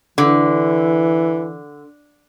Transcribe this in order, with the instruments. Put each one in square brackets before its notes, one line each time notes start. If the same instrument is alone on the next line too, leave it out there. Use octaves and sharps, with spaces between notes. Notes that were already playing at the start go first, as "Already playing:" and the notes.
[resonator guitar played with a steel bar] D3 [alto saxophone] E3